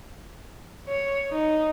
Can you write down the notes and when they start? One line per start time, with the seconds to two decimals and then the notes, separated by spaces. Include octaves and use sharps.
0.89 C#5
1.32 D#4